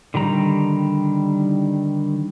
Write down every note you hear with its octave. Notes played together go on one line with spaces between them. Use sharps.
D3 D#3 G3 A#5